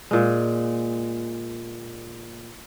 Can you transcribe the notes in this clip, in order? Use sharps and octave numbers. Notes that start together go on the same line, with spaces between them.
A#2 G#3